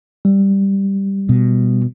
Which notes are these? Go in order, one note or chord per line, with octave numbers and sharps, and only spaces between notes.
G3
B2